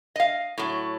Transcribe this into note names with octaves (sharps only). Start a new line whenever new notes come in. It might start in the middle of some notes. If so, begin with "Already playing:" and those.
D#5 F5
A2 F#3